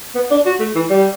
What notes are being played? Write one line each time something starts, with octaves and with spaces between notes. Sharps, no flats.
B3
D4
F#4
A3
E3
G3